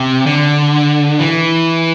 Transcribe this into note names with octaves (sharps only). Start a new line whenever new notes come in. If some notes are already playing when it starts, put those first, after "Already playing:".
Already playing: C3
D3
E3